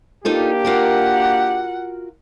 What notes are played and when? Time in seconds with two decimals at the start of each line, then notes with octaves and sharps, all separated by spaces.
0.25 A#3 D4 D#4 F4 G4 A4
0.64 F4 F#4 A#4 F#5